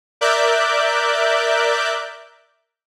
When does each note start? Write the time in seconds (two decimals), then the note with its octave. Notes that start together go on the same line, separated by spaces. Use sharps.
0.21 A#4 D5 E5 D6 F#6 G6